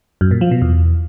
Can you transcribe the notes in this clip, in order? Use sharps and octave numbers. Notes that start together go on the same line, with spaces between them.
F#2
A#2
F3
B2
E2